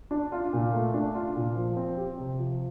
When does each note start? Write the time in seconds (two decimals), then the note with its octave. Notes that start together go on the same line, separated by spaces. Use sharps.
0.11 D4
0.32 F4
0.53 A#2
0.73 A3
0.94 D4
1.15 F4
1.36 A#2
1.56 F3
1.76 C4
1.97 G4
2.18 C3
2.38 F3